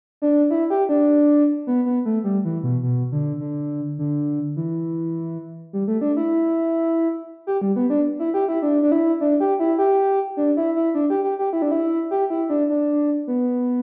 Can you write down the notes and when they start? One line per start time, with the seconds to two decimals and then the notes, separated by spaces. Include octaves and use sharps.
0.22 D4
0.50 E4
0.70 G4
0.89 D4
1.67 B3
1.85 B3
2.05 A3
2.24 G3
2.45 E3
2.63 B2
2.83 B2
3.12 D3
3.40 D3
3.99 D3
4.56 E3
5.73 G3
5.88 A3
6.01 D4
6.17 E4
7.47 G4
7.61 G3
7.76 B3
7.90 D4
8.19 E4
8.34 G4
8.48 E4
8.62 D4
8.83 D4
8.92 E4
9.21 D4
9.40 G4
9.60 E4
9.79 G4
10.37 D4
10.57 E4
10.76 E4
10.95 D4
11.10 G4
11.24 G4
11.39 G4
11.53 E4
11.62 D4
11.71 E4
12.11 G4
12.30 E4
12.49 D4
12.69 D4
13.27 B3